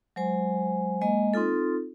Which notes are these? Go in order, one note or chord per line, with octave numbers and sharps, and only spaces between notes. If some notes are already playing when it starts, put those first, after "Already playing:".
F#3 G#3 C5 G#5
G#3 A#3 D#5 G#5
C4 D#4 F4 A4